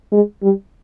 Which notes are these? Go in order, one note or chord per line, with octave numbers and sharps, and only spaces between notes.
G#3
G3